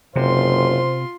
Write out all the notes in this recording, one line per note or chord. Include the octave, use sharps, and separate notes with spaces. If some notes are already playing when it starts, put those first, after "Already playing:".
F#1 C3 F4 C5 C6